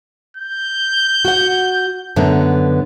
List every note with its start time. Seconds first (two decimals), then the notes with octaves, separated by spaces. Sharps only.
0.37 G6
1.25 F#4 F#5
2.16 F#2 D3 B3